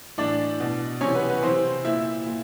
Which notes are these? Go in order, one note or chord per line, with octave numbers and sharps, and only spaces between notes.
A2 E3 D4 D5
B2
C3 E3 C#4 C#5
B3 B4
B3 B4
C3 E3 C4 C5
A#2 E4 E5
A#2